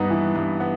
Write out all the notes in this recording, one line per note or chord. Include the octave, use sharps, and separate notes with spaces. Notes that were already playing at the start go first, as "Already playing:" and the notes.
Already playing: G2 B3 D#4
E3
G2
B3